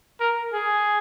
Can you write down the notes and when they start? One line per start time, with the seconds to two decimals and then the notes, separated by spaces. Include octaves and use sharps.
0.20 A#4
0.53 G#4